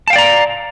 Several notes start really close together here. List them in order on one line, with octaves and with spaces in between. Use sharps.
A5 F5 G5 D5 A#5